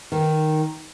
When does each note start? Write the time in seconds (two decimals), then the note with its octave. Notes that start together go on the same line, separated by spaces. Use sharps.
0.12 D#3